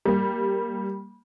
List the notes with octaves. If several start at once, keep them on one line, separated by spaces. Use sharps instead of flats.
G3 A#3